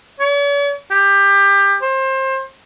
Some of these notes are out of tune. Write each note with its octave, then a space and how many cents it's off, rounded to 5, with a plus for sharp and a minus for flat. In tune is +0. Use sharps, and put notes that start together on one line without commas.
C#5 +45
G4 +20
C5 +25